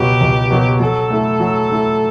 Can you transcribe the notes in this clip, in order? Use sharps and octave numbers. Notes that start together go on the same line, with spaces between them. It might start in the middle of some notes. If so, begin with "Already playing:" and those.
Already playing: C#2 B2 F#3 B3 G4
C#2
B2 F#3 B3
F#3 A4
A3 E4
F#3
A3 E4